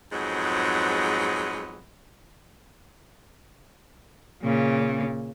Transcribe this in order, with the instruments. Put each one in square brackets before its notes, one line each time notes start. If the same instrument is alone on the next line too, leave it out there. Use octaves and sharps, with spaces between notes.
[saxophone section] F2 G#2 F#3 G#3 B3
[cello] A#2 C#3